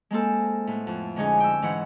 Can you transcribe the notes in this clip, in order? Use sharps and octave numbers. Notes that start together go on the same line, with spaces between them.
G#3 A#3 C4 A4
A2 B3
F2
D3 G#3 C#4 D#4 G#4
G5 E6
G#2 E3 C#4 E4 F#5